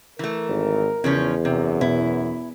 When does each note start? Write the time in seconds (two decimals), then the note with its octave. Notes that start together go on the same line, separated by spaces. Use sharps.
0.19 E3 A3 A#4
0.49 G#1
1.04 E2 C#3 F3 C#4
1.45 F#2 C3
1.81 B2 B3 E4